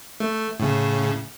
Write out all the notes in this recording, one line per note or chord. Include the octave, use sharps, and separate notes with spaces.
A3
A2 C#3